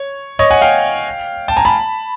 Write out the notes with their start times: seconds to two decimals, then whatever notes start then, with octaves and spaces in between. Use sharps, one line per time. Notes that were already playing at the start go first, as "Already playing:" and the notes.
Already playing: C#5
0.39 C#5 D#5
0.51 F#5 G#5
0.61 F5 G5
1.48 G5 A5
1.56 G#5 A#5
1.65 A5 B5